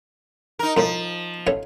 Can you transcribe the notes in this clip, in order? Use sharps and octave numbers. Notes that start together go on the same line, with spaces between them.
D#4 A#4
C2 A2 F3
A1 A3 C#5